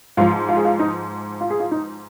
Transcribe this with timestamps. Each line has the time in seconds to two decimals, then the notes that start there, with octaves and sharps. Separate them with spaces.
0.17 G#2 F3 F4
0.49 F4
0.57 G#4
0.65 F4
0.79 D#4
1.41 F4
1.50 G#4
1.60 F4
1.71 D#4